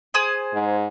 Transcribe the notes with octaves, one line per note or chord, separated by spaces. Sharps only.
G#4 C5 D#6
G#2